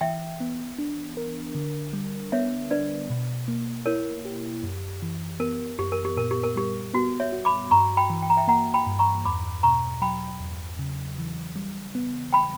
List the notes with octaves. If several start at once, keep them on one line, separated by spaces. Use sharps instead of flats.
E3 E5 G5
B3
D4
A#4
D3
G3
B3 C#5 E5
D4 B4 D5
B2
A#3
E4 A#4 C#5
G4
F#2
E3
B3 A#4
F#2 G4
A#4
G4
A#2 A#4
G4
A#4
G3 G4
B3 F#4
C#5 E5
F#4
B5 D6
G2 A#5 C#6
G5 B5
E3
G5
A#5
E5 G5
A#3 F#5 A#5
G5 B5
G2
A#5 C#6
E2 B5 D6
B2 A#5 C#6
F#3 G5 B5
E2
C#3
E3
G3
B3
G5 B5